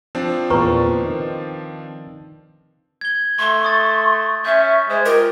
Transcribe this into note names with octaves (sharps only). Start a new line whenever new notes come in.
F3 C4 D4
E2 A#2 B4 A#5 C#6
D#3
G#6 G7
A3 C6 C#6 G#6
C#6 D#6 A6
C#4 E5 G6
G#3 C5
F4 G4 A#4